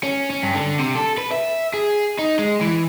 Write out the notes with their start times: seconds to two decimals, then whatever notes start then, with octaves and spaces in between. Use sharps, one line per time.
0.03 C#4
0.30 C#4
0.42 G2
0.55 D3
0.79 C3
0.95 A4
1.18 B4
1.32 E5
1.74 G#4
2.19 D#4
2.39 G#3
2.61 E3